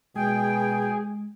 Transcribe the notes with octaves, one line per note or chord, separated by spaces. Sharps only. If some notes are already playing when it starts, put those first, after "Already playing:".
B2 G#3 G#4 G5